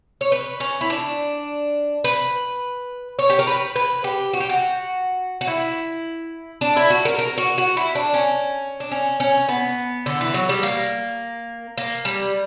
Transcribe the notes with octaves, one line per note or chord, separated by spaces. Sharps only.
C#5
B4
C#4
E4
D4
B4
C#5
G4
A#4
B4
B4
G4
F#4
G4
F#4
F#4
E4
D4
E4
F#4
A#4
A#4
F#4
F#4
E4
D4
C#4
D4
C#4
C#4
B3
D3
E3
F#3
G3
A#3
A#3
G3